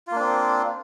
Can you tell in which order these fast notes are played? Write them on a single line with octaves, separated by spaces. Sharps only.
F4 A#3 D4 C4